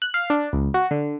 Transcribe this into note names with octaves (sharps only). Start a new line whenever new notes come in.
F#6
F5
D4
C#2
F#4
D3